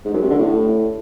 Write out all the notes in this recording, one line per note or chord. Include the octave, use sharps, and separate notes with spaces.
G#2
F#2
C3
D3
A2